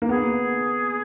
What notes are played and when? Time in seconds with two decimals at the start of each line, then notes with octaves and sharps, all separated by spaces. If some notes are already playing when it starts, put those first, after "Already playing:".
0.02 A#3
0.09 B3 G#4